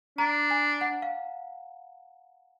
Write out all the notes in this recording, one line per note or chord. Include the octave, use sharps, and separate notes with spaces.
D4 A#5
G#5
F#5
F5